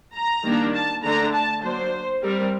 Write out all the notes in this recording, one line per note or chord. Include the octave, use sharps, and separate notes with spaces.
A#5
D#3 G3 A#3 D4
A5
D3 A3 D4 A#5
A5
F#3 A#3 D4 C5
G3 C4 A#4